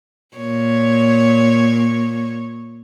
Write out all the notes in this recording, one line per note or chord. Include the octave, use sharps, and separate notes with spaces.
A#2 C#5